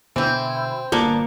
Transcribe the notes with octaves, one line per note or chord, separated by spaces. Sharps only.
B2 D3 E3 B3 C4 E4
G1 A#2 A#3 B3 D4